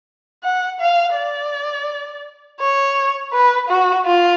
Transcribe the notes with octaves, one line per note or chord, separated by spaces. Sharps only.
F#5
F5
D5
C#5
B4
F#4
F4